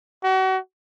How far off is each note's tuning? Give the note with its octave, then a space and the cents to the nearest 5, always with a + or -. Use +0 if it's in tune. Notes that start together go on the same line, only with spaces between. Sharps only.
F#4 +35